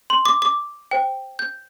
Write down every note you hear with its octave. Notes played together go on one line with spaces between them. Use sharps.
C6
D6
D6
C5 G5
G6